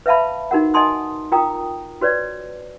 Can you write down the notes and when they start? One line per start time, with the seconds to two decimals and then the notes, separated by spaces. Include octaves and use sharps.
0.06 B4 E5 F5 A5 B5
0.51 D#4 F#4 A#4 F#5
0.74 D#5 F#5 G#5 A5 C6 D#6
1.32 F4 A#4 G5 A#5 D#6
2.01 F#4 B4 C#5 D5